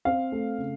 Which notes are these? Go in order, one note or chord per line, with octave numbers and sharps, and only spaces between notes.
C4 F5
A3
C#3